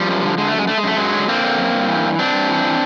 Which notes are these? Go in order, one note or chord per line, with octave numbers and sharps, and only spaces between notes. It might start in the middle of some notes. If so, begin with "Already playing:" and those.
Already playing: F3 G3
F#2
D3
D3 G#3
A3
F#2 G#3
D3 A3
G#3
F#2 A3
F#2 F#3 G#3
D3
D3 A#3 C4
D3
F#2
G2
E3
G2
G2 C4 D4
G2
E3
E3